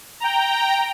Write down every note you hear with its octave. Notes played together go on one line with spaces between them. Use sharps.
G5 A#5